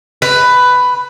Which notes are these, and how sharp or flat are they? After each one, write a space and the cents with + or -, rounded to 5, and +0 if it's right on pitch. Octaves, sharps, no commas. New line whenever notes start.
B4 +10